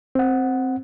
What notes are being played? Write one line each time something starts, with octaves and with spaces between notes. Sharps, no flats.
C4 F#5